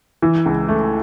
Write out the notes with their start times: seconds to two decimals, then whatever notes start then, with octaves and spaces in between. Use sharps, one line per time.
0.22 E3
0.46 C#2
0.68 A3